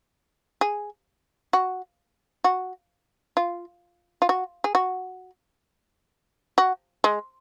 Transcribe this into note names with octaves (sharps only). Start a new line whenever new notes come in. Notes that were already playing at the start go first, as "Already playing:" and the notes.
G#4
F#4
F#4
F4
F4
F#4
G#4
F#4
F#4
G#3